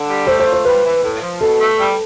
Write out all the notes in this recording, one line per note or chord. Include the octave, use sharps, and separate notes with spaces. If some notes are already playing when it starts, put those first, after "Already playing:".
Already playing: D3
G3
A3 C5
C5
F4
C5
G3 B4
E3
A2
F3
B2 A4
A3
G3